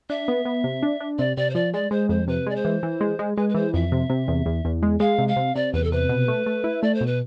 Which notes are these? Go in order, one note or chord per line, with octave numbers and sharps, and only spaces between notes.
D4 E5
B3
B3
C3
D4
D4
C3 D5
C3 D5
C5
F3 D5
G#3 D5
G#3 C5
F2 C5
C3 B4
G#3 D5
C5
E3
E3
G#3
G#3
G#3 B4
B4
E3 C5
F2 E5
C3
C3
E2
E2
E2
G#3
G#3 F5
C3
F5
C3
C3 D5
E2 B4
A4
C3 B4
B2
A3
A3
E4
A3 D5
C5
B2
B4